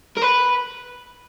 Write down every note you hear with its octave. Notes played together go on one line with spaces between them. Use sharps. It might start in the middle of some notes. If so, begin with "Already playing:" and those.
A#4
B4